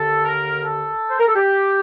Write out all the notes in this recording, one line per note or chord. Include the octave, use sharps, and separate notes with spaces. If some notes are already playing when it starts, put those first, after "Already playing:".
Already playing: D#2 D3 A4
A#4
A4
C5
A#4
A4
G4